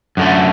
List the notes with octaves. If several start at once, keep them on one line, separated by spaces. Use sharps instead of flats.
F#2 D3 A3